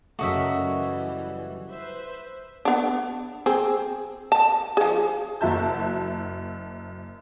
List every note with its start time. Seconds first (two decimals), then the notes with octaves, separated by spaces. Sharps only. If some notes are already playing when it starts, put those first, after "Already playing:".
0.19 F#2 C#3 A3 F#4 A#4 D#5 E5
0.58 E3 G3
1.70 B4 C5 E5
2.65 B3 D4
3.46 C4 G#4
4.32 A5
4.77 F3 G#4
5.41 F#1 F#2 F#4 E5 A5 G6